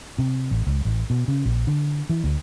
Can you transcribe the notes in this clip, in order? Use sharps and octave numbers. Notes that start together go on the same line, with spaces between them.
C3
A1
C#2
A1
B2
C#3
A#1
D3
E3
D2